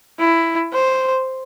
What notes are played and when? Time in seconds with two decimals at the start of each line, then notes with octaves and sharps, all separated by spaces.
0.19 E4
0.73 C5